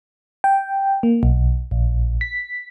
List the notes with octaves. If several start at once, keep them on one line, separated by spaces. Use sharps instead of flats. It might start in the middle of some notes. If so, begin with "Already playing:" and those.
G5
A#3
B1
A#1
B6